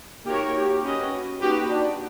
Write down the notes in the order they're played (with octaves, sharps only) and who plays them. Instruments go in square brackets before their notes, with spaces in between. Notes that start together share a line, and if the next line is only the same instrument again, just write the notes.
[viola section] A#3 D#4 F#4 A#4 C#5 [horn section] G4
[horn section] G4
[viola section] C#4 F#4 B4 D#5
[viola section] A#3 D#4 F#4 B4 [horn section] G4
[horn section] D4